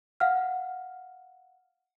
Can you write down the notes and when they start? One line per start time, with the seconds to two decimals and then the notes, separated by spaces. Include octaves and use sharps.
0.20 F5 F#5 F6